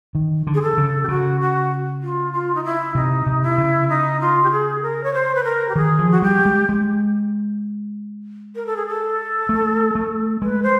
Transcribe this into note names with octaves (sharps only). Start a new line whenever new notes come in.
D#3
D3
G#4
A4
C#3
G4
C#3 F#4
F#4
F4
F4
D#4
E4
C3 D#4
C3
E4
C#3
D#4
F4
G4
G#4
A#4
C#5
C5
B4
A#4
G4
D#3 G#4
F3
F#4
G3 G4
G#3
G#3
A#4
A4
G#4
A4
A3
A3
G#3 B4
C5